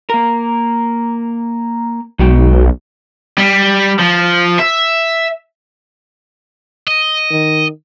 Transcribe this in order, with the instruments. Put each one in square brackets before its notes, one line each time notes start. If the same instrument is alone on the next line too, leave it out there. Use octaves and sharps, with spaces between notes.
[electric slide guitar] A#3 A#4
[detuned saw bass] B1 [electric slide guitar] G#3 F#4 G5
[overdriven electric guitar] G3
F3
E5
[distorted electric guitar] D#5
[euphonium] D#3